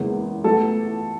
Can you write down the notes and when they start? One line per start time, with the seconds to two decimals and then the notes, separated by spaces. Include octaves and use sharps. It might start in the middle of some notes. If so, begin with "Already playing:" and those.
Already playing: F#1 E2 C#3 G#3 B3
0.44 A1 A2 E3 B3 A4